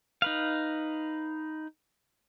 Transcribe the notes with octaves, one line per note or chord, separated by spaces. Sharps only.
D#4 B4 F5